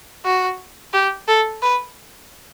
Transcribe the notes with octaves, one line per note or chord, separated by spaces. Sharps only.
F#4
G4
A4
B4